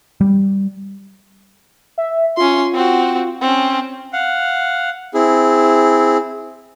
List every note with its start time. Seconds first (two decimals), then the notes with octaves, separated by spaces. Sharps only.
0.21 G3
1.98 E5
2.37 C#4 F4 C6
2.74 C4 F#4
3.41 C4 C#4
4.13 F5 F#5
5.14 C4 E4 G#4